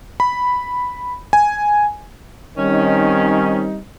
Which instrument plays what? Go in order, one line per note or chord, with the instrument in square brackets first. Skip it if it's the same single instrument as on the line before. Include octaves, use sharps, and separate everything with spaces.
[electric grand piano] B5
G#5
[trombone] D#3 [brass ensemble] G3 C4 D#4 [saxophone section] C#4